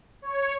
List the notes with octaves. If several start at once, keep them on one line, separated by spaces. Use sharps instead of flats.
C#5